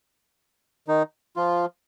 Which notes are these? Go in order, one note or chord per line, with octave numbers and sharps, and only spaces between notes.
D#3 D#4
F3 F4